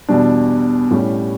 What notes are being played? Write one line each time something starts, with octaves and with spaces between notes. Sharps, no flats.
E2 B2 G3 D4
A2 G3 C#4 G4